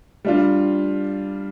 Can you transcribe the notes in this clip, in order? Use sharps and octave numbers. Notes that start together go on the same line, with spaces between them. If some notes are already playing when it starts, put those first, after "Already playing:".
G3 D4 F4